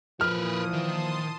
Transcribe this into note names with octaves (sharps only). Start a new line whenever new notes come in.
A#2 E3 F3 A#4 B4 D#6 F6
D#3 A5 C6 D#6